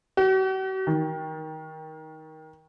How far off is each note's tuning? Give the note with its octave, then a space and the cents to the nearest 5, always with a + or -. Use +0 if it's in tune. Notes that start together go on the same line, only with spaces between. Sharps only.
F#4 +45
D#3 +15